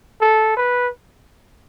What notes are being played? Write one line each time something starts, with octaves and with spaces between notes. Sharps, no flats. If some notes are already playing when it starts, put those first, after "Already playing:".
A4
B4